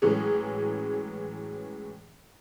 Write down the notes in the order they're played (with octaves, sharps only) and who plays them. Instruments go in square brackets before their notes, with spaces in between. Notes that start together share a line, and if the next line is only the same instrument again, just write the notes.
[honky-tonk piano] A2 E3 F#3 G#3 C#4 G#4